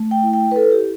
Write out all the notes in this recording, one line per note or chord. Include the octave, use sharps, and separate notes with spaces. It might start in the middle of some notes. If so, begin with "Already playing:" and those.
Already playing: A3
G5
E4
G5
B4
E4 A4
G4